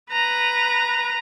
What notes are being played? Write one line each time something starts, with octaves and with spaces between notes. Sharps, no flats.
B4 A#5